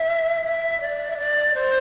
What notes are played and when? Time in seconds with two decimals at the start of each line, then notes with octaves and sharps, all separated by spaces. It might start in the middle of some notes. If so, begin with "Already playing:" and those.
Already playing: E5
0.45 E5
0.81 D5
1.11 E5
1.18 D5
1.54 C5